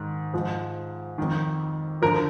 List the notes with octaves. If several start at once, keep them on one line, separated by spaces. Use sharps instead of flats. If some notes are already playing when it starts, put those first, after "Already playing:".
Already playing: G#2 D#3
G#2 F3
F2 D#3
D3 F3 A#4